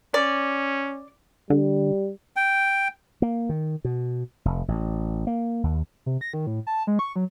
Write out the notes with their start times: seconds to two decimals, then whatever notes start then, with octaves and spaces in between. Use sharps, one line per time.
0.14 C#4 D5
1.50 D3 G3
2.36 G5
3.22 A#3
3.49 D#3
3.85 B2
4.45 F1
4.68 A1
5.27 A#3
5.63 D#2
6.06 C3
6.21 A#6
6.34 D#3
6.47 A2
6.67 A5
6.87 G#3
6.99 C#6
7.16 F#3